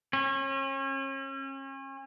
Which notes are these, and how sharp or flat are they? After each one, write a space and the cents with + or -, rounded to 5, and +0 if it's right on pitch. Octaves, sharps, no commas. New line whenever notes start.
C#4 -35